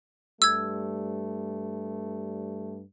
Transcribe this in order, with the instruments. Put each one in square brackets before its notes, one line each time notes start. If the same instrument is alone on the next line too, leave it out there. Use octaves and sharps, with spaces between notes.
[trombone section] G2 G3 A3 [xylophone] E6 G#6